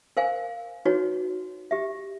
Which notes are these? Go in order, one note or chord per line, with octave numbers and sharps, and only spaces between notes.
A#4 C5 F5 G#5
D#4 F#4 B4 C#5
G4 E5